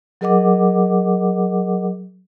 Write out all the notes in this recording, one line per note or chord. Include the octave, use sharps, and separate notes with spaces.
F#3 G#4 A#4 D#5 F#5 D6